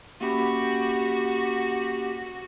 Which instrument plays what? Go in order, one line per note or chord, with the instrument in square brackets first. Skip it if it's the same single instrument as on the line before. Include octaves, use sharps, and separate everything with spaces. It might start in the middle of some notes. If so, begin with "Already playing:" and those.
[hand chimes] A#3 C#4 B5 [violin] F#4 [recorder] G4